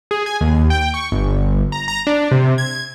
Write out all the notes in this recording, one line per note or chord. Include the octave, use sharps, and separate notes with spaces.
G#4
G#5
D#2
G5
C#6
G1
A#5
A#5
D4
C3
G#6